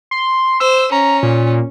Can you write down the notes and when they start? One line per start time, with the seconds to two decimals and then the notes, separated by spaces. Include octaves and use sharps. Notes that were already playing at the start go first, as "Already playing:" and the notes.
0.11 C6
0.60 C5 E6
0.92 C#4 A#5
1.23 A#2